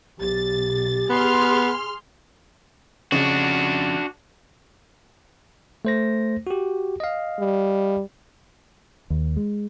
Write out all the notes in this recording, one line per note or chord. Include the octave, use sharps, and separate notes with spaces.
B1 G4 A6
B3 G#4 C6 F6
F2 C#3 D4 F#4
A3 C5 A#6
F#4 G4
D#5 F5
G3
D#2
G#3